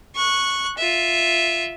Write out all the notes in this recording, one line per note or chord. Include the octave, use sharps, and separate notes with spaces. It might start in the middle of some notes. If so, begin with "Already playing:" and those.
C#6 F#6
F4 E5